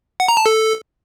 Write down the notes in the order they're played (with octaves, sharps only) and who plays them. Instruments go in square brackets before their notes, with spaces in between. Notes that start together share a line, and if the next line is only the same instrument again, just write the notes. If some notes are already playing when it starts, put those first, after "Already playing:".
[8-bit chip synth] F#5
A#5
A5
A4